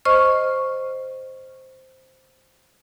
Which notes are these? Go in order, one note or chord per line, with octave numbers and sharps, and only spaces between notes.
C5 D#5 C#6 F6